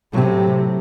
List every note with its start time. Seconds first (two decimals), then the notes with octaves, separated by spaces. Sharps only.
0.13 A2 C3 F#3 C4 G4